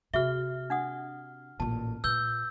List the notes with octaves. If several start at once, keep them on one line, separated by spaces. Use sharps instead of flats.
C3 F#4 G#4 E5 F6 G7
D4 F#5 D#6
A1 A#2 A5
A#2 B4 E6 G6 G7